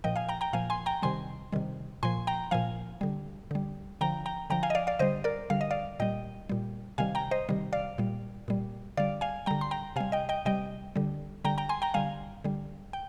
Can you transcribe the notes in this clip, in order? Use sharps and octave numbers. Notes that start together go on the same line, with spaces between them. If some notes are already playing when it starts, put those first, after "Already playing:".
A#2 F3 D#5 G5
F5 G#5
G5 A#5
G5 A#5
A#2 F3 F5 G#5
G#5 C6
G5 A#5
C3 D#3 G3 G#5 C6
C3 D#3 G3
A#2 F3 G#5 C6
G5 A#5
A#2 F3 F5 G#5
D3 G3
D3 G3
D3 F3 G5 A#5
G5 A#5
D3 F3 G5 A#5
F5 G#5
D#5
D5 F5
D5 F5
D3 G3 C5 D#5
A#4 D5
D3 G3 F5
D#5
D5 F5
A#2 G3 D#5 G5
A#2 G3
C3 D#3 G3 F5 G#5
G5 A#5
C5 D#5
C3 D#3 G3
D5 F5
A#2 G3
A#2 G3
D3 G3 D5 F5
F5 G#5
D3 G3 G5 A#5
C6
G5 A#5
C3 G3 F5 G#5
D#5 G5
D#5 G5
C3 G3 D#5 G5
D3 G3
D3 G3 G5 A#5
G5 A#5
G#5 C6
G5 A#5
D3 G3 F5 G#5
D3 G3
G5